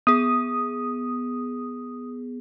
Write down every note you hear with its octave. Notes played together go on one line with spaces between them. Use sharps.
B3 G#4 D#6